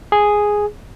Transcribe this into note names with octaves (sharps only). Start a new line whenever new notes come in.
G#4